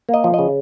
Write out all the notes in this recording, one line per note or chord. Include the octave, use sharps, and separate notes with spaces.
A#3
D#5
F3
C#3 D#5